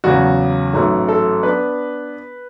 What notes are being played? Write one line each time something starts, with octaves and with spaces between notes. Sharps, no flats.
E2 C#3 F#3 F#4
A1 G#2 F#3 A3
A4
B3 D4 B4